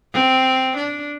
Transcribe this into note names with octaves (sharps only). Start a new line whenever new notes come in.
C4
D4